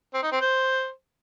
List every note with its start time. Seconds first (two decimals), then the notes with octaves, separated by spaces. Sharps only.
0.14 C4
0.23 D#4
0.32 C4
0.41 C5